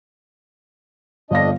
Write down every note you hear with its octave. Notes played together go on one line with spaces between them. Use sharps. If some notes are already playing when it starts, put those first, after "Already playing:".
G1 F2 D4 D#5 F5 A#6